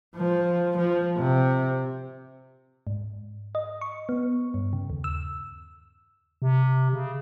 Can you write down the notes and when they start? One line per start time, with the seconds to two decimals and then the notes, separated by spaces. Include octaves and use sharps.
0.16 F3
0.78 F3
1.18 C3
2.87 G#2
3.55 D#5
3.81 C#6
4.09 B3
4.54 G2
4.73 C#3
4.90 D#2
5.04 E6
6.42 C3
6.93 C#3